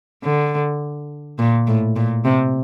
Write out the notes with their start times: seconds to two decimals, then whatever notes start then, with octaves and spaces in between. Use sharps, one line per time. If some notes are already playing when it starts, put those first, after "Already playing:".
0.23 D3
1.39 A#2
1.67 A2
1.96 A#2
2.25 C3